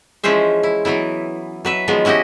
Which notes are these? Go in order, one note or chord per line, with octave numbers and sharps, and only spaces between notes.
E3 F3 G#3 C#4 C5 E5
E4
E3 F#3 B3 E4
F#3 B4 E5
D#3 F3 F#3 G#3 B3
C#4 E4 F#4 G4 D#5